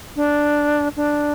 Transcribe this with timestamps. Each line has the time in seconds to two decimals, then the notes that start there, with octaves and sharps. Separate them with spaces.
0.16 D4
0.96 D4